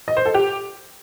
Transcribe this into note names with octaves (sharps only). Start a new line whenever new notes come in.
D#5
C5
A4
G4